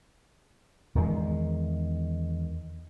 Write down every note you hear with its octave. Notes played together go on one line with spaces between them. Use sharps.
E2 D#3 G#3